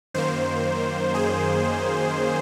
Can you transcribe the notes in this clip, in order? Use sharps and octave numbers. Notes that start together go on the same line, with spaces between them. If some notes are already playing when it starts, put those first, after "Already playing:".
F#2 D#3 A#3 C5
G#4